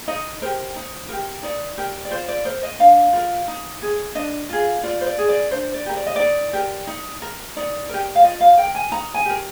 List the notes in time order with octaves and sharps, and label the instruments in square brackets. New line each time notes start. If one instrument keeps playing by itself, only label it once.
[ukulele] D#4 D#5
G4 A#4 C5
D#4
G4 A#4
D#4 D5
G4 A#4
D5
F4 C5
D5
A#4 C5
D#5
D4 F5
F4 A#4
D#4
G#4
D4 D#5
F4 G#4
F4 D5
C5
D5
G#4
D5
D4 C5
D5
G4 A#4
D5
D#5
D#4 D5
G4 A#4
D#4
A#4
D#4 D5
G4 A#4
F5
F4 D#5
F5
A#4 G5
G#5
D#4 A#5
G#5
G4 A#4